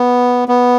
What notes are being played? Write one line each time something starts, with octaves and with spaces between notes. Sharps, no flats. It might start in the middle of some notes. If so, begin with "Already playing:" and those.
Already playing: B3
B3